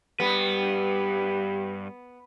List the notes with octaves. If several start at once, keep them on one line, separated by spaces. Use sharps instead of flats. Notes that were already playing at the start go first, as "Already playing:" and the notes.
G2 G3 B3 G4 B4